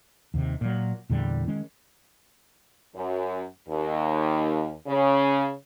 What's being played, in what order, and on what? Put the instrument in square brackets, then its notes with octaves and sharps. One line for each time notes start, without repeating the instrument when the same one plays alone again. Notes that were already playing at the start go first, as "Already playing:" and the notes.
[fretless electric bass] D#2 C3 D#3
A#2 F#3
E2 A#2 D3 G3
D#3 G#3 C#4
[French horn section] F#2
D#2
C#3